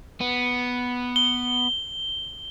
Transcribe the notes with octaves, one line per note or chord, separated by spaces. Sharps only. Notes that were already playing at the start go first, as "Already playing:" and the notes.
B3
G7